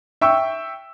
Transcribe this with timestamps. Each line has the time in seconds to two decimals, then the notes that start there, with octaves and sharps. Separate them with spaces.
0.21 E5 G5 C#6 E6